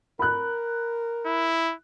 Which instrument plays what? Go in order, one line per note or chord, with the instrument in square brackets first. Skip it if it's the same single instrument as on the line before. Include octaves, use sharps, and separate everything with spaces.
[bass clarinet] A#4 [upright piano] B5 F#6
[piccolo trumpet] E4